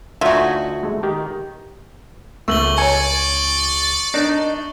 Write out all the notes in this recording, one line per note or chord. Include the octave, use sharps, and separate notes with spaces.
D2 D#4 F4 F#4 E5 G#5 G#6
G#3 A3
D#3 G4
C#2 A3 C#6 E6 F#7 G7
C#5 D5 G#5 C#7
D4 D#4